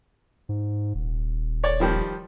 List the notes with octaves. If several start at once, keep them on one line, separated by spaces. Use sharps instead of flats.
G#2
D#1
C#5 D5
D#3 F3 G3